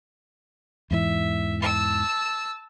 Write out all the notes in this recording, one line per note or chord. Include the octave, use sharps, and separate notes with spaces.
E2 G#2 E3 E5
A5 E6